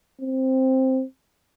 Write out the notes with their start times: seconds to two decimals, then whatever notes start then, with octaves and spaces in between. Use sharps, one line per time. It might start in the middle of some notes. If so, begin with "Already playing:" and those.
0.21 C4